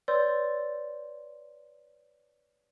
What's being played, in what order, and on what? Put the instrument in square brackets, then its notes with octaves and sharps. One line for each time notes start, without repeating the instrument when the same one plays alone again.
[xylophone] B4 C#5 D5 C6 E6 G6